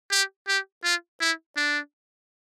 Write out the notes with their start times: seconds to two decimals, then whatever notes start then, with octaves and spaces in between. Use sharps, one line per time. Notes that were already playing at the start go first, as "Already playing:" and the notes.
0.11 G4
0.48 G4
0.84 F4
1.21 E4
1.57 D4